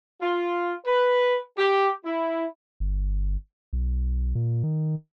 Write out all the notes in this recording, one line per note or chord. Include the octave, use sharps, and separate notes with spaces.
F4
B4
G4
E4
G1
B1
A#2
D#3